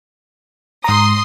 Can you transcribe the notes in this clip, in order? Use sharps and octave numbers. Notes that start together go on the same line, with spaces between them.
G#2 A#5 C6 D#6